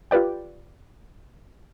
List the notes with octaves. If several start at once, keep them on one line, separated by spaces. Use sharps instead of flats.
F4 G4 B4 D5 G5